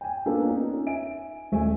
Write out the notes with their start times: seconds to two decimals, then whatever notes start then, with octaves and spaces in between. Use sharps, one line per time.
0.01 G5 G#5
0.26 A#3 B3 C#4 D4 F4 A4
0.45 C#4 D#4
0.86 E5 G#5 D7
1.52 D#1 A3 A4 G#5